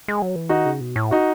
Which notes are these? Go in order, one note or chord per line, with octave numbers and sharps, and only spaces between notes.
G#3
F#3
E3
D#3 D#4 F#4
C#3
B2
A2
D#4 F#4